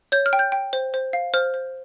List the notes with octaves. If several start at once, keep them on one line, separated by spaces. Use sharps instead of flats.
C#5 G6
F6
G5
G6
G5
C5
C5
F5
C5 F6
C5